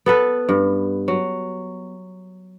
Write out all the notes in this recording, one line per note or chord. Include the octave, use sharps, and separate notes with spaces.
B3 A4 B4
G2
F#3